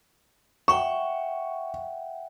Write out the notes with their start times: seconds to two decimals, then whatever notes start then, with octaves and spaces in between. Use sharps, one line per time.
0.68 E5 F#5 G5 C#6